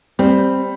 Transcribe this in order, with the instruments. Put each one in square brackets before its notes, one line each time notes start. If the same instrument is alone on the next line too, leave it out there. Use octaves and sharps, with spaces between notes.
[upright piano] G3 [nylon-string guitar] C4